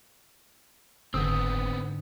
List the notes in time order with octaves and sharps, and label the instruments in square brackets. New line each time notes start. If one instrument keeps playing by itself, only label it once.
[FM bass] F#1 [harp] G#2 D3 [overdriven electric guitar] B3 C4 [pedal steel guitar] D#6 E6